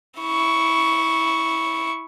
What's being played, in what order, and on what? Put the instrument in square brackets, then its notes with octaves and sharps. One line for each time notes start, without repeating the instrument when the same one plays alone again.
[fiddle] E4 C#6